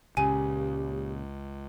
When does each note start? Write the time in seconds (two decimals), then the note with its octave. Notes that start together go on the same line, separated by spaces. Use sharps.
0.17 C#2 A#2 C#3 G4 G#5